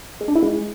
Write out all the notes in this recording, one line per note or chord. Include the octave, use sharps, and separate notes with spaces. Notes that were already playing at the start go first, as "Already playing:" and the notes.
G#3
D4
E4
G#3